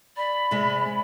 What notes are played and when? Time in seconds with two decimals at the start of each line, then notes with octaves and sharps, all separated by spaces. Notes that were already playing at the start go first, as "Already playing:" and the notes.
0.17 D5 B5
0.51 C3 G#3